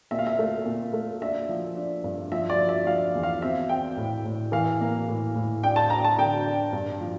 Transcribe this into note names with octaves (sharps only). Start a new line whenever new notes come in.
A#2 E5
F5
E5
A3
A#2
A3
D4 E5
F3
D4
G2
F3 E5
D5
F3
E5
F3 F5
E2
F5
C4 E5
C4 G5
A2
A2
E3 F5
A#3
A2
A2
D4 G5
A5
D4 A#5
A5
D3 G5
D4
G2
F3